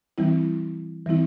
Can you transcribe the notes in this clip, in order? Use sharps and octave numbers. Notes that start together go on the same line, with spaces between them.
E3 G3 C4 E4
E3 G3 C4 E4